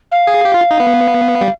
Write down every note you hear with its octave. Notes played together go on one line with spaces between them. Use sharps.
F5
G#4
G4
F4
D#4
B3
G3